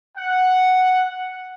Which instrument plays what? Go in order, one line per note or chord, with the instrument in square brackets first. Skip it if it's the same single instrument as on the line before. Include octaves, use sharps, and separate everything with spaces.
[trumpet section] F#5